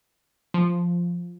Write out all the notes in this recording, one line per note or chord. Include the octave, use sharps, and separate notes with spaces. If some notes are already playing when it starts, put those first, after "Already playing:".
F3